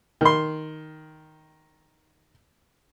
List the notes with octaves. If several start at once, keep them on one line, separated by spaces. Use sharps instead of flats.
D#3 C6